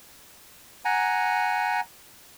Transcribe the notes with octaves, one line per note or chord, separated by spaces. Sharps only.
F#5 G#5 A#5